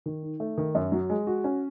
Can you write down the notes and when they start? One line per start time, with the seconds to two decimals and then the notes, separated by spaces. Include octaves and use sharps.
0.06 D#3
0.23 D#4
0.40 A3
0.58 D#3
0.75 F#2
0.92 F#3
1.10 G#3
1.27 F#4
1.44 C#4